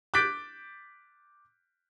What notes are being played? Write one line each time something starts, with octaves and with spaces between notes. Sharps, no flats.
D6 F#6 G6 A6 B6 D7